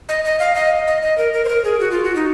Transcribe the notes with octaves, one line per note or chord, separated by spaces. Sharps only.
D#5
D#5
F5
D#5
D#5
D#5
A#4
A#4
C5
A#4
G#4
F#4
F4
F#4
D#4